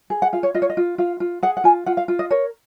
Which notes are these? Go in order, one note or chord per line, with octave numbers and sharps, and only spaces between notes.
G#4
F#5
F4 F5
C#5
F4 D#5
C#5
D#5
F4
F4 F5
F4
G#4 F#5
F#5
F4 G#5
F4 F#5
F5
F4
D#5
A#4 C#5